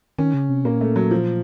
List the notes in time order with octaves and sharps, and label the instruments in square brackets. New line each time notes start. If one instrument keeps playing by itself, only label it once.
[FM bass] D#3 [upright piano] C#4
[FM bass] C#3
C3
[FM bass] A#2 [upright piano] A#3
[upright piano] A3
F#3
F3